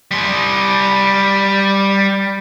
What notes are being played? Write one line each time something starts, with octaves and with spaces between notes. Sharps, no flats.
G3 C6